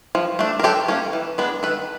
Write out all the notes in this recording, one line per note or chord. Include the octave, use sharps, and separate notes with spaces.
F3
A3 D4
A#4
F#3 G4 A4
A#3 C#4
E3
G#3 B3 D4
D#3 A4 B4